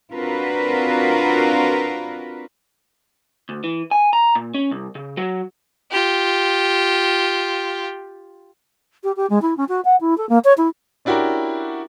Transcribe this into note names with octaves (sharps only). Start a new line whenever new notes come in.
C4 D4 F4 F#4 A#4 B4
D2
E3
G#5
A#5
A#2
C#4
C2
C#3
F#3
F4 G4
G4
G4
G#3
E4
C#4
F#4
F#5
E4
A4
A#3
C#5
E4
C#4 D4 E4 F#4 G4 A#4